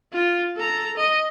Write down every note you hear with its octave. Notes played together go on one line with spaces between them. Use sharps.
F4
A4 A#5
D#5